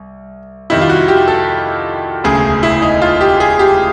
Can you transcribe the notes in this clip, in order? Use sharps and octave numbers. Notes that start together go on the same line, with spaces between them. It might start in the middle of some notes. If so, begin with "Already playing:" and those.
Already playing: C2
F2 C3 D#3 G3 E4
F4
F#4
G4
A4
E1 D2 C#3 G#4
E4
D#4
F4
G4
G#4
G4